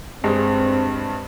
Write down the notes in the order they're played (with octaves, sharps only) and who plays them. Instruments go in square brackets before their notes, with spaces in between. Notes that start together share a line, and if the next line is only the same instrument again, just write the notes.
[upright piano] G2 G#3 [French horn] C4